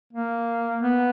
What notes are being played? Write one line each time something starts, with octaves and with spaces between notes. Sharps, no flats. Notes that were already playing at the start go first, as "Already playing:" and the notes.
A#3
B3